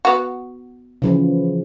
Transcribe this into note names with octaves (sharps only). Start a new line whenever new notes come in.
B3 F#4
C#3 E3 F3